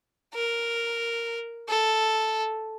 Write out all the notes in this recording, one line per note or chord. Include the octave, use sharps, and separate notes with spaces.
A#4
A4